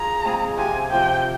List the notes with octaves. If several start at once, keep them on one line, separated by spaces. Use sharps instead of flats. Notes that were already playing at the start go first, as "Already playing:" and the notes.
Already playing: F4 G#4 A#5
G#3 C4 F4 G#4
C3 F3 C4 G4 G#5
C3 F3 C4 G4 G5